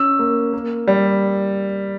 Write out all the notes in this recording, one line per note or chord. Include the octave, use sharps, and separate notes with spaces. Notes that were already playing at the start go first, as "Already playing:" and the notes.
Already playing: C#4 E6
A#3
A#3
G3